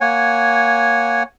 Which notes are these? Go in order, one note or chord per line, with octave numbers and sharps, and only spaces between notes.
A#3 C#5 F#5 G#5